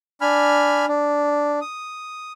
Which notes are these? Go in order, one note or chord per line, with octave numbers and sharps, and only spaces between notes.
D4 G#5 B5 F6
D4
D#6